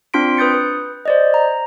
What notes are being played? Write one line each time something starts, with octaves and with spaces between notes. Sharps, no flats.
C4 D4 F4 C6 B6 D7
B4 D#6 G6 A6 C#7
B4
C5 D5 D#5
A#5